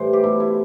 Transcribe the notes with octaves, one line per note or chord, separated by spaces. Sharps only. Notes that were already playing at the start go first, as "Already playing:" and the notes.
Already playing: A2 E3 G3 C5
G4
B2 A3 E4
E4